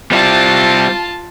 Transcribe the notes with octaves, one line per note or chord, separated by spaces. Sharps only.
G3 C4 F4 A5